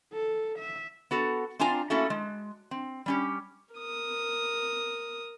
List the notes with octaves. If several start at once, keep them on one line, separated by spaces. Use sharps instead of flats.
A4
E5
B3 F#4 A4
C4 D4 F4 G#5 A#5
A3 A#3 C#4 E4 F#4 A4
G#3
C4
G3 C#4 G4
A#4 D#6